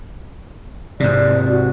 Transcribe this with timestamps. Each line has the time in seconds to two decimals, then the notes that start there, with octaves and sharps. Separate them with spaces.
1.00 G#2 C3 D5
1.50 F#4